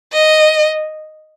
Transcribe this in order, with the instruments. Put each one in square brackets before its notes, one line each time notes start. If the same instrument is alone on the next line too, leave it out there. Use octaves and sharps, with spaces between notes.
[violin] D#5